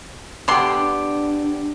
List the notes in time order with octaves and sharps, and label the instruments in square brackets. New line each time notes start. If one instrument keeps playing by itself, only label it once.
[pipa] D3 C6 [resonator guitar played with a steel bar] B3 G4
[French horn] D4